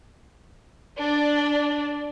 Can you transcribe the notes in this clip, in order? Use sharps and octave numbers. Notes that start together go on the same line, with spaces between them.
D4 D5